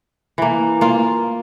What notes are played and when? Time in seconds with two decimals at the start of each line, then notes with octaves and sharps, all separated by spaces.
0.38 E3 A#3
0.81 A#3 F4